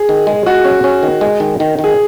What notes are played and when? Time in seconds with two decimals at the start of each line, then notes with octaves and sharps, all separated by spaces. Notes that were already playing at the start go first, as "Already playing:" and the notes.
Already playing: G#4
0.09 D#3
0.27 G#3
0.46 G#3 F#4
0.65 C#4
0.84 C#4
1.03 D#3
1.21 G#3
1.40 D#3
1.60 D#3
1.79 D#3
1.84 G#4